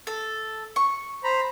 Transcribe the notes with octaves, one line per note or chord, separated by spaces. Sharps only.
A4
C#6
C5 A#5 B5